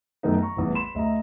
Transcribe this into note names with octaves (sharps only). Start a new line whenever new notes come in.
F#2 D#3 A3 B3 D#4
A#5 C#6
A1 E2 G2
B5 C6 E7
D2 D#5 E5 A#5